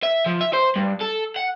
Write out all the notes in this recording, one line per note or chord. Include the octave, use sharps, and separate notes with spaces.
E5
F3
E5
C5
G2
A4
F#5